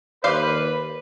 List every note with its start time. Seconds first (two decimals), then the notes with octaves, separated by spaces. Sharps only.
0.24 D#2 B4 C5 D5 F5